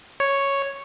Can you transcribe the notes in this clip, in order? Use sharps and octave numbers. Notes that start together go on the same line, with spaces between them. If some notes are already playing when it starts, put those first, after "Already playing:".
C#5